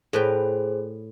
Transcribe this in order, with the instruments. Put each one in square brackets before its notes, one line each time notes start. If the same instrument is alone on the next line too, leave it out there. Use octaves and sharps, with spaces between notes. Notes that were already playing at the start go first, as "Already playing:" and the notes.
[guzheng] A2 B4 G5 [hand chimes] G#4 C5